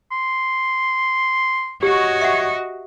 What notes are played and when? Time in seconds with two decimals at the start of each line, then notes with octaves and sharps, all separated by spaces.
0.12 C6
1.83 F#4 G4 C#5 D#5
2.21 E5 F#5